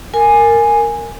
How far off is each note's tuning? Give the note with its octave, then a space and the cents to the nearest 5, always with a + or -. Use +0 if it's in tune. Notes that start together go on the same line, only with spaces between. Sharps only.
A#4 -15 G#5 +0